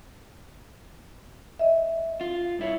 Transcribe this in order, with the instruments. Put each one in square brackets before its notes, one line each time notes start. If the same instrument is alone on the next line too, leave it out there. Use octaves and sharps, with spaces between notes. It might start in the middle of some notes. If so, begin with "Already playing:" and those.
[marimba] D#5 E5
[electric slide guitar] F4
G2 E4 C#5